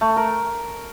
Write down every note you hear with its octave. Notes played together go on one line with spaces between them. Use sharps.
A3
A#4